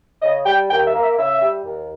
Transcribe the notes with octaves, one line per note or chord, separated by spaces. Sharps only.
C#3 D#5
G3 G5
D#2 G5
E5
A#3
E5
C#3 E5
G3
D#2